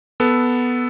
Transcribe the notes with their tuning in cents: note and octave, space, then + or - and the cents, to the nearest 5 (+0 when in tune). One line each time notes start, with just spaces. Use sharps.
B3 +0 A4 -5